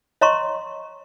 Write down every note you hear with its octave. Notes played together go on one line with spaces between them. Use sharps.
C#5 D#5 A#5 C6 C#6